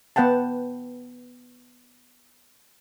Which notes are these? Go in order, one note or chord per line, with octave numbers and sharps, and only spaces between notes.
B3 B4 F#5 G5 A5